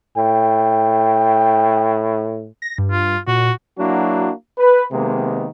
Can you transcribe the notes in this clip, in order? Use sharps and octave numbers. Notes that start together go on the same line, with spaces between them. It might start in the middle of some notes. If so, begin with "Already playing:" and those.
A2 G5
A#6
G2
F4
A#2 F#4
F#3 A#3 D4 E4 F#4
B4
C3 D#3 G#3 A#3 B3